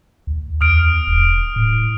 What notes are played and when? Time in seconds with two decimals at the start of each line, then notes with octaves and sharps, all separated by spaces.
0.27 D2
0.61 E2 D#6 F6 D7
1.07 D#1
1.56 A2